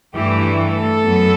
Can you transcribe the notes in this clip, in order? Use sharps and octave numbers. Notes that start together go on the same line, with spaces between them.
G2 E3 A3 G4
A4
F#2 F#3 B3